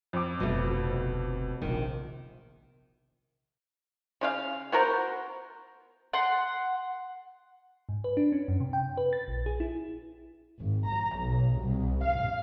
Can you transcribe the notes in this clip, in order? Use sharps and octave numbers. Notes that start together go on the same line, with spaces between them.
F2 D6
F1 D2 B2 A3
A#1 C3 D#3
C#3 F4 F5
B3 F#4 A#4 C5
F#5 C6
G#2
B4
D4
C#4
F#2
C3
G5
B4
A6
A#1
G#4
E4
G#1
A#5
B1
C2
F5